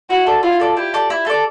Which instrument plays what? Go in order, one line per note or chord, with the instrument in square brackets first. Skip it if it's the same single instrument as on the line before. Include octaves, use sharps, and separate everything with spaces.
[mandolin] E4 [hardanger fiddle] F#4
[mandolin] A4 D5
[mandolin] E4 [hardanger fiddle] F4
[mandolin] A4 D5
[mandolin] E4 [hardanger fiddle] G4
[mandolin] A4 D5
E4
A4 D5